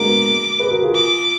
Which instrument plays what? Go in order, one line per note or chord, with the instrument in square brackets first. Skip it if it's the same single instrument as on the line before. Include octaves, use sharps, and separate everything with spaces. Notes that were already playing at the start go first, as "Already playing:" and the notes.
Already playing: [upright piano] G#3 A#3 B3 D4 F#4 A#4 [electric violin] D6
[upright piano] G#4 B4
F#4 A#4
F4 G#4
[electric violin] D6